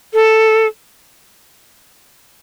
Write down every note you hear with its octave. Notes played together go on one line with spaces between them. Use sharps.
A4